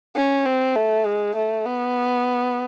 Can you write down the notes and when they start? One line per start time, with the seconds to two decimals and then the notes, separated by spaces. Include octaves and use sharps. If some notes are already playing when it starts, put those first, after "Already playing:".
0.16 C#4
0.45 C4
0.75 A3
1.06 G#3
1.36 A3
1.65 B3